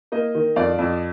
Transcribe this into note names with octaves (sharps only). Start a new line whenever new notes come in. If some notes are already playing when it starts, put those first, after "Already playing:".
A#3 D#5
D#3
F2 D5 F5
F2